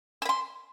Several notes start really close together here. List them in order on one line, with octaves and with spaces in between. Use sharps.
E6 B5 C6